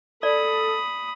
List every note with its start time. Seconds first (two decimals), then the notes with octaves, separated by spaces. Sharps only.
0.23 A4 D5 B5 D#6